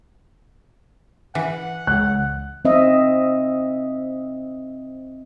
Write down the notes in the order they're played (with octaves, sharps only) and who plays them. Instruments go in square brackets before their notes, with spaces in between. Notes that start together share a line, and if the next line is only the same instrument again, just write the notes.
[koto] E3 [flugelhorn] F#5
[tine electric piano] C#2 [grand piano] F#6
[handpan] C4 D#5 E5